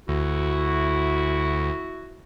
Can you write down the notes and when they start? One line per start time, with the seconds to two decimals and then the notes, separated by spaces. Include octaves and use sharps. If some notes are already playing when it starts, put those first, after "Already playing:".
0.08 D2 E4 F#4